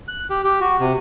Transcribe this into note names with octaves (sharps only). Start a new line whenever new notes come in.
F#6
G4
G4
F#4
C3